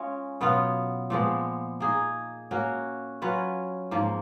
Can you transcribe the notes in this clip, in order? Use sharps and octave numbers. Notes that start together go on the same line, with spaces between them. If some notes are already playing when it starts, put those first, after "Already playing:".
Already playing: G#3 C#4 F4
B2 F#3 B3 F4
A#2 F3 G#3 B3
A#3 D#4 G#4
A#3 C#4 F#4
F#3 C#4 F4 B4
G#2 F3 A#3